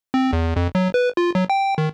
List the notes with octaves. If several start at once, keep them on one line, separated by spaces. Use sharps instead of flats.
C4
E2
F2
F#3
B4
F4
F#3
G5
D#3